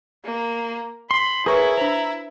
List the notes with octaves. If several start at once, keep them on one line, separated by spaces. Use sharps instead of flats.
A#3
B5 C6
E4 G#4 A#4 B4 C#5 C#6
D4 C5 A#5